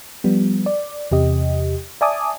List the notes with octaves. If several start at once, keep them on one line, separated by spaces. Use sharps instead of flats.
F3 G3 B3
D5
E2 C3 G4 D#5
D5 E5 G#5 A5 D6 D#6